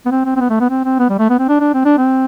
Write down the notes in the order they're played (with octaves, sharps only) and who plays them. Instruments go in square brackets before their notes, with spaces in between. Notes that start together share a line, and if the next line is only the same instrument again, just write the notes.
[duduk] B3
C4
C4
C4
B3
A3
B3
C4
C4
B3
G3
A3
B3
C4
D4
D4
C4
D4
C4